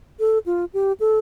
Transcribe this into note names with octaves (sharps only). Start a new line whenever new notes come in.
A4
F4
G4
A4